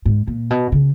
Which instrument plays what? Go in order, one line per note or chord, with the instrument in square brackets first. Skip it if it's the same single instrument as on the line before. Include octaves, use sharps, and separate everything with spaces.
[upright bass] G#2
A#2
B2
C#3